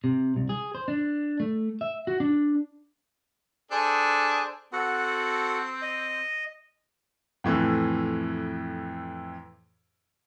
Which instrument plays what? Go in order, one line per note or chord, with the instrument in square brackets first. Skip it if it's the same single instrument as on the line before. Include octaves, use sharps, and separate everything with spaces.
[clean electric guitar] C3
C2
G#4
C5
D4
A3
E5
F#4
D4
[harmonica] D4 G#4 A4 [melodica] C5
[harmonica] C4 [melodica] F#4 A4 F#5
[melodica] D#5
[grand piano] F2 A2 E3